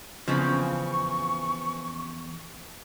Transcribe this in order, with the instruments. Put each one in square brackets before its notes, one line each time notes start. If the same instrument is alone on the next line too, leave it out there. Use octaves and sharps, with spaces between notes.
[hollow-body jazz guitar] E2 F3 [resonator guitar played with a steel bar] C#3 E3 C4 [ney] C#6